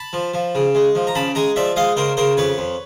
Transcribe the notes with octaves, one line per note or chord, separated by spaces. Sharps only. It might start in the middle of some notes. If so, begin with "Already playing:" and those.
Already playing: A5 B5
F3
F3
C#3
G#3
F3
A#5
C#3 A5 B5
G#3 G#5 A#5
F3 D5 E5
G#3 D#5 F5
C#3 A#4 C5
C#3 A#4 C5
F2 B4 C#5
F2